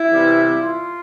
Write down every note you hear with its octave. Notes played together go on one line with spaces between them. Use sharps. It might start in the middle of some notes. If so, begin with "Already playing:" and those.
Already playing: E4
C3 E3 G3 B3
F4